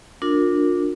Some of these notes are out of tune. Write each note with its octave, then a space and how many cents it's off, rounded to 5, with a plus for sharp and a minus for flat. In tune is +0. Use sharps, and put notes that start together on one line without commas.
D4 +0 F4 +35 A#4 -15